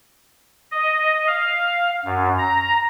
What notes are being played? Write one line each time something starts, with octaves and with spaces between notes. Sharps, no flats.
D#5
F5
F#2
A#5